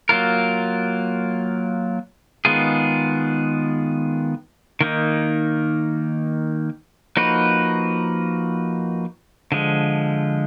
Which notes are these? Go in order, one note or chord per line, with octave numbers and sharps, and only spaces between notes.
F#3 A#3 F4 A#4
D#3 G#3 B3 F4 G#4
D#3 A#3 D#4
F3 A#3 D#4 F#4 B4
D3 F3 G#3